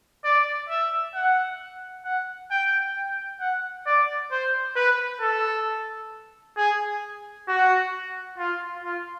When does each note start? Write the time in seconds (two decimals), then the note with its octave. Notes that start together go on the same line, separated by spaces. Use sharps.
0.24 D5
0.69 E5
1.15 F#5
2.05 F#5
2.51 G5
2.96 G5
3.40 F#5
3.87 D5
4.32 C5
4.76 B4
5.21 A4
6.57 G#4
7.48 F#4
8.38 F4
8.84 F4